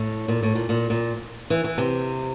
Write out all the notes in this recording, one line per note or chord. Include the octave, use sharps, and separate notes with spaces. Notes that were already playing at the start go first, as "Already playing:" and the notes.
Already playing: A2
A#2
A2
A#2
A#2
A#2
E3
E3
C3